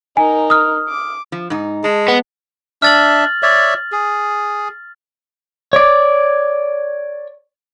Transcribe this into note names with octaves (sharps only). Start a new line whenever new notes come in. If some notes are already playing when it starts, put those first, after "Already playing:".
D#4 A#4 G#5
D#6 F6
D6
F3
G#2 D#4
G#3 A5
B3
D4 E5 F6 A6 F#7
C#5 D5 E5
G#4
C#5 D5